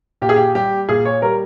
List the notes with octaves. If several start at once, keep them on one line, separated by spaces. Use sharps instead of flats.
A#2 G4
G#4
G4
G3 G4
A#2 G#4
C#5
G3 A#4